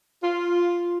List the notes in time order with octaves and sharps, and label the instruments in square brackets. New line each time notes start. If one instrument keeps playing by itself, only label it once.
[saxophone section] F4